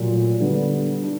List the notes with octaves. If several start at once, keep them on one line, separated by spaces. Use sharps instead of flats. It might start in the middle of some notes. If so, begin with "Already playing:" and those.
Already playing: A#2 F#3 A3
D3 G3 B3
D4